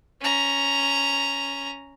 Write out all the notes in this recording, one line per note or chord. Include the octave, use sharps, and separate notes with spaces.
C#4 A#5